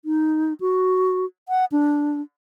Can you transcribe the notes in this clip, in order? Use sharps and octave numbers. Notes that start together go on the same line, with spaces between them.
D#4
F#4
F#5
D4